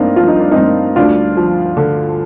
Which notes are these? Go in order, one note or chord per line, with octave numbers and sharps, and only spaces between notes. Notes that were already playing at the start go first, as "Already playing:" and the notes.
Already playing: G2 A#3 C4 D4 D#4 F4
F3 F4
D#4
D4
G2 C4 D#4
D2 D4 F4
F3
D3